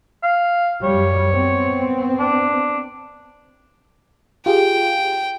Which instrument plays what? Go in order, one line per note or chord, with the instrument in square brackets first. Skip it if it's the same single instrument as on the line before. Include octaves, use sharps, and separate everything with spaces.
[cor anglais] F5
[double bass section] F#2 G3 [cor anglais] C#5
[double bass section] B3 C4
[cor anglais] D4
[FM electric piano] F4 G4 G#4 [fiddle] G5